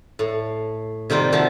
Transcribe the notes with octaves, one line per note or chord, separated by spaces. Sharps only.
A2
C3 D#3 G3 A#3 F4
D#3 F3 F#4 E5 A5